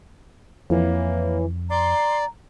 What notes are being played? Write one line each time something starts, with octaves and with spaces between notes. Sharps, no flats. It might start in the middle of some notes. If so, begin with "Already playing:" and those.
F2 E3 A#3 C#5
D5 A#5 C6